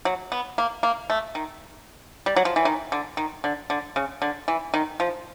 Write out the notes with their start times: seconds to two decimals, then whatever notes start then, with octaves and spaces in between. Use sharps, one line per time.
0.05 F#3
0.32 B3
0.58 A#3
0.83 A#3
1.10 A3
1.35 D#3
2.26 G3
2.36 F#3
2.45 F3
2.56 E3
2.65 D#3
2.92 D3
3.17 D#3
3.44 D3
3.70 D3
3.96 C#3
4.22 D3
4.48 E3
4.74 D#3
5.00 F3